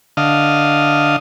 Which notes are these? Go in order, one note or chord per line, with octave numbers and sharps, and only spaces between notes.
D3 D#5 F5